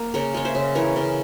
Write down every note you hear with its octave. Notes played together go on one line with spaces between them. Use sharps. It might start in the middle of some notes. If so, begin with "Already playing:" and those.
Already playing: A#3
C#3 A#4 C#5
G#3 C#5
C5 E5
C#3
E3 A#4 C#5
C#3